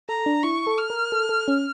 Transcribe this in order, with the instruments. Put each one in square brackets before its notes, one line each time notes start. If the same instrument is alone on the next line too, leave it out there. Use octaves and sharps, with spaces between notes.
[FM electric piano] A4 [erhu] A#5
[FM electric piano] D4
[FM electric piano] E4 [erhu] C#6
[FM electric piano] A4
[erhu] F6
[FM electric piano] A#4
A4
A4
C#4